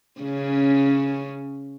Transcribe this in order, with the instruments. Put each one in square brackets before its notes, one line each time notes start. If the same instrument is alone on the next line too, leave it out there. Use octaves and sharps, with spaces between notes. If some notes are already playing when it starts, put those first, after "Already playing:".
[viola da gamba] C#3 C#4